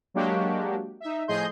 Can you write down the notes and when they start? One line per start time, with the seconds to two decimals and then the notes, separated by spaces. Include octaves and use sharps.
0.14 F#3 G#3 A#3 D4 F#4 G4
1.01 D#4 E5
1.28 A2 F3 G#4 D#5 C6 G6